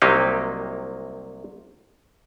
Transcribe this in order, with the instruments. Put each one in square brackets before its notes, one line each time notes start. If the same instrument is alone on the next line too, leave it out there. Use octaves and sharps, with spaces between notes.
[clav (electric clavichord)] C2 C3 F#3 A#3 D#4 G4